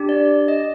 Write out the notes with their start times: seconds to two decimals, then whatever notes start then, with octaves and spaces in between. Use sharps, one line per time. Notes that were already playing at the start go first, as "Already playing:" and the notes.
Already playing: D4 G4
0.09 D5
0.48 D#5